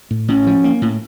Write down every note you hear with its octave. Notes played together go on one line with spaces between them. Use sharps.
A2
A2 C#4
F3
A#3
A2